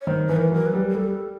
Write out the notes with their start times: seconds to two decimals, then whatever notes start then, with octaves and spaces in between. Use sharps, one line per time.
0.01 C#5
0.07 D#3 C5
0.29 E3 B4
0.36 A#4
0.52 F#3 A#4
0.66 B4
0.74 G3
0.89 A#4
0.95 G3 A4